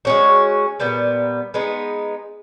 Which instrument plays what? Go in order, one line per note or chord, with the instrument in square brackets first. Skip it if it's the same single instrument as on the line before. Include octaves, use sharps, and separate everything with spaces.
[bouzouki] G#3 C#4 F#4
A#2 G3 B3
G#3 B3 D#4